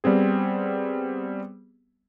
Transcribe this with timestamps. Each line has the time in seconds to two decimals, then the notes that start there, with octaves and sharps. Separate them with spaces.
0.04 G3 B3 C4 G#4